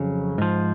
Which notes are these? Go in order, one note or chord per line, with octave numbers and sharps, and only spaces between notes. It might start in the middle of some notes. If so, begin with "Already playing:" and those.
Already playing: F2 C#3 F#3
G#2 F3